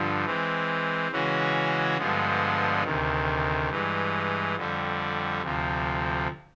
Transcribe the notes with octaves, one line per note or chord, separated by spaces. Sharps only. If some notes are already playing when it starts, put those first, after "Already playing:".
Already playing: G2 D3 F3
E3 G#3 C4
C#3 E3 G#3 C#4 F#4
G2 D3 F3 G#3 B3
D2 C3 D#3
G2 E3 G#3
F2 D3 G3
D2 C3 F3